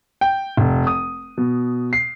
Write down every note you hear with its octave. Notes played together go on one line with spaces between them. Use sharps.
G5
F1
D#6
B2
C7